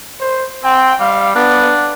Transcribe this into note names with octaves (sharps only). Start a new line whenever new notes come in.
C5
C4 G5
G3 F5
B3 D4